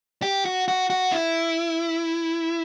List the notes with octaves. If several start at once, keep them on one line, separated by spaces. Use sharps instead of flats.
G4
F#4
F#4
F#4
E4